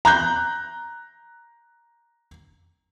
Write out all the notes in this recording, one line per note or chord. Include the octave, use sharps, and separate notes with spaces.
A#5 F#6 G6